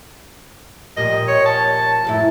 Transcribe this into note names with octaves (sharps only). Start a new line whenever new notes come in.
A#2 F3 G3 D#5
C#5
A5
F#2 A2 E4